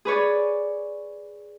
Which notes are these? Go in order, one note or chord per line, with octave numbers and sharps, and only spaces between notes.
G#4 B4 C#5 D5